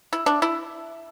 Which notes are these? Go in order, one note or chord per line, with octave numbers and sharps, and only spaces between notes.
E4
D4
E4